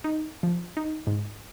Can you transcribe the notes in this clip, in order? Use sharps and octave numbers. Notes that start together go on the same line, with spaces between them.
D#4
F3
D#4
G#2